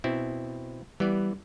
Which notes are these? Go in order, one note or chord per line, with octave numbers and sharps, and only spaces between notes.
B2 C4 E4
E3 G3 B3 D5